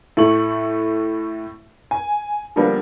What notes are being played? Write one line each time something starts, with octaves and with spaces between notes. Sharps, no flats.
A2 A3 C#6 F#7
G#5
D3 F3 G3 A#3 B3